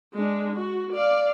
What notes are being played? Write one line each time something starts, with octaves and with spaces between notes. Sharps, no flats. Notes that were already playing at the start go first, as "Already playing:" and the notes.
G#3 D4
F#4
D5 F5